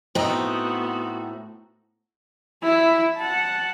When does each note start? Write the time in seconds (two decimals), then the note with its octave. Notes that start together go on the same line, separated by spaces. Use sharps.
0.15 A2 B3 C4 D#4 F#4
2.63 E4 E5
3.17 F#5 A5